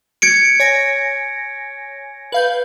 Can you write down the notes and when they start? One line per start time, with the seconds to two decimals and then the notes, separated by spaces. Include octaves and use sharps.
0.22 G#6 C#7 D7
0.60 C#5 G#5 A#6
2.32 B4 F5 G6